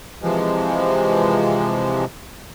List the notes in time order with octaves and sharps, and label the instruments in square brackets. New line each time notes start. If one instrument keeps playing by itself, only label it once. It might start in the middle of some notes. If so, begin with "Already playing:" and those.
[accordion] C3 E3 F3 G#3